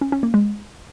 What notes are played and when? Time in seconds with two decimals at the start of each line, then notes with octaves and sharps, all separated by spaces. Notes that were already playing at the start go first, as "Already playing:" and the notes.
0.01 C#4
0.12 C#4
0.23 A#3
0.34 G#3